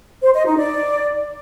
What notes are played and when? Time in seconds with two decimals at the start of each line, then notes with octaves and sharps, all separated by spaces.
0.22 C5
0.33 D#5
0.45 D#4
0.57 D5